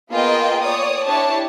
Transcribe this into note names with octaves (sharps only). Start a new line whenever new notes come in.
A#3 B3 F4 G#4 D#5 G5
C#5 D5 D#6
D4 E4 G4 C#5 A5